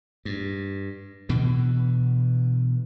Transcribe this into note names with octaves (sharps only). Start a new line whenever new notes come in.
G2
B2 D3 E3